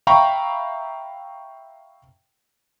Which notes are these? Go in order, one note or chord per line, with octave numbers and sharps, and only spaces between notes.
E5 F5 G5 A#5 B5 C#6